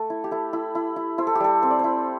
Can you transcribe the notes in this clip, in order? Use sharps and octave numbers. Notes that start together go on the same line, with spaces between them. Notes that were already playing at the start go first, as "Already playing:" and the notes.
Already playing: A3 A4
E4
G4
E4 A4
E4
E4
E4
E4 C5
A4
G4
G3 A4
C4 C5
D5
E4 C5